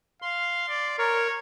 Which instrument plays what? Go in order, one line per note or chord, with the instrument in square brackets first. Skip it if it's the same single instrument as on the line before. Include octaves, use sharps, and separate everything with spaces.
[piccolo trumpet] F5 [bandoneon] C6
[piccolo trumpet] D5
[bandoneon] A#4 [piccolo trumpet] C#5